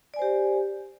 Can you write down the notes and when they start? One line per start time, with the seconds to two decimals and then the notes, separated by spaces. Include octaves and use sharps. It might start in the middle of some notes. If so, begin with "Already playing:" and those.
0.14 D5
0.16 G#5
0.19 C5
0.22 G4